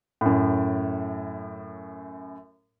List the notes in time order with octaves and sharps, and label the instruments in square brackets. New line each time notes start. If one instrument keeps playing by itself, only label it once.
[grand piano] F#2 A2